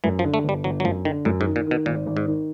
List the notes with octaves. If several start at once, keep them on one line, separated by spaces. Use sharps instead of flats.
F#2 E3
F3
D3
A3
G1 G3
G1 F#3
F#3
F#2 F3
D3 D#3
F#2 A2
G#2
D#3
A#2
B2 D#3
G#1 A#2
G#1
G#2
D#3